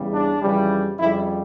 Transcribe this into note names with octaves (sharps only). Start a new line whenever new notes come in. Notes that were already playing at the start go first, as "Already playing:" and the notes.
Already playing: E2 C#3 G3
D4
F2 C#3 E3 G3
F2 C#3 G3 E4